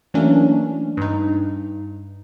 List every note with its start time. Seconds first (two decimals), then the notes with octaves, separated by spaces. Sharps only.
0.14 E3 F#3 A3 A#3 C#4 D4
0.97 G2 D#4